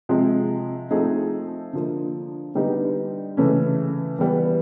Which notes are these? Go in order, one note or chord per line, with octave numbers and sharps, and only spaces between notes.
C3 F3 G#3 C4
F3 A3 C4 D#4 G#4
D3 F3 A#3
D3 G3 B3 D#4 G4
C#3 E3 A3 C#4
E3 G3 B3